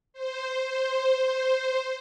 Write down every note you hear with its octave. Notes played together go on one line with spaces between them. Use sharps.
C5
C5